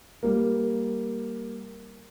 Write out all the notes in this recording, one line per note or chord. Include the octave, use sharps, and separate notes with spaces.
G3 A#3